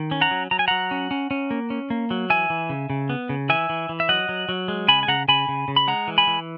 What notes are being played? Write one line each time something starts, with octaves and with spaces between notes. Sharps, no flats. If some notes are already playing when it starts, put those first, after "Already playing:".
Already playing: D#3
C#4
F#5 A#5
F#3
F#3 A#5
G#5
F#3 F#5 A#5
C#4
C#4
C#4
A#3
C#4
A#3
F#3
E3 E5 G#5
E3
C#3
C#3
B3
C#3
E3 E5 G#5
E3
E3
E5
F#3 D#5 F#5
F#3
F#3
G#3
C#3 G#5 B5
G#5
C#3 F#5 A#5
C#3 G#5 B5
C#3
C#3
B5
G#3 F#5 A#5
E3
G#5 B5
E3